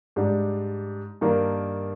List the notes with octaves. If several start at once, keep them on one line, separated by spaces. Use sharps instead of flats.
G#2 G3 D4
G2 D#3 A#3 D4